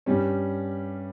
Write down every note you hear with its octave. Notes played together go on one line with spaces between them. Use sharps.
G2 G3 C#4